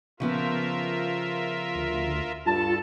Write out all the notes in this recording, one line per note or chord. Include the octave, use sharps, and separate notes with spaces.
C#3 F3 B3 F4 A#4 E5
D2
G2 F4 A4 A5